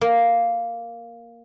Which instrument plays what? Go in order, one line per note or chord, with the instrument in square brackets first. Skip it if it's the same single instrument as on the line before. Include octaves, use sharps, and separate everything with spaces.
[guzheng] A#3